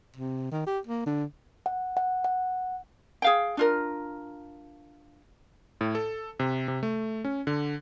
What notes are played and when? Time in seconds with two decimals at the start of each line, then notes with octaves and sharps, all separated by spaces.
0.16 C3
0.52 D#3
0.67 G4
0.87 A#3
1.06 D3
1.66 F#5
1.97 F#5
2.24 F#5
3.22 G#4 F5 G5
3.57 D4 F4 A#4
5.81 A2
5.95 A4
6.40 C3
6.68 C3
6.83 A3
7.25 C#4
7.47 D3